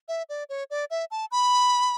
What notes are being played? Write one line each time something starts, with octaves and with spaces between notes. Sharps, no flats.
E5
D5
C#5
D5
E5
A5
B5